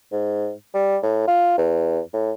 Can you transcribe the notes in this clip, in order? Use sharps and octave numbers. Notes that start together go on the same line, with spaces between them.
G#2
G3
A2
F4
E2
A2